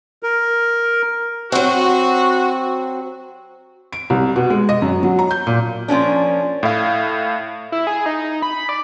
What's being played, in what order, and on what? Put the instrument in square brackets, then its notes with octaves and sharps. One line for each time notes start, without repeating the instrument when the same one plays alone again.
[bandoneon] A#4
[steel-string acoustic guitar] F#3 C4 [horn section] F#4
[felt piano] D7
C2
B2
G#3
D#5
F#2
F#3
A#5
G6
A#2
[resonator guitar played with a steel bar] F3 A#3 C#4 D4
[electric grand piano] A2 E4 F5
[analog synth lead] E4
G#4
D#4
B5
D5